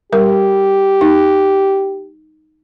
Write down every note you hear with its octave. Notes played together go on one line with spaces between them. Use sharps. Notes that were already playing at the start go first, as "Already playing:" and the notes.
G3 G4 A#4
D#4